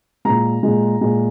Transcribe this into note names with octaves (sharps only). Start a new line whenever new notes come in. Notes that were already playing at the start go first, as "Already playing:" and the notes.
A#2 G#3 A#5
A#2 G#3
A#2 G#3